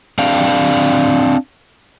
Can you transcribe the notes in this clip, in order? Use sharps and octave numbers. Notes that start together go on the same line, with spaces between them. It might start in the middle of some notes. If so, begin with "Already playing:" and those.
C4 D4 F5 G5